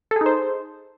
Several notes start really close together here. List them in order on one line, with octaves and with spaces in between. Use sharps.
A4 G#4 D#4 C5